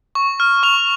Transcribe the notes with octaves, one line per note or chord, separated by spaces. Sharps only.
C#6
F6
C#6 F7